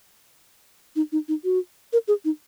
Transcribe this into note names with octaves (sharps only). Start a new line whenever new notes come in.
D#4
D#4
D#4
F#4
A#4
G#4
D#4